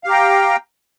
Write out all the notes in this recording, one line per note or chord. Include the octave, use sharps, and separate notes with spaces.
G4 F5 G5 A#5